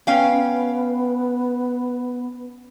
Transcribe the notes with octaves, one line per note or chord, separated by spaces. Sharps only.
B3 C#4 F5 G5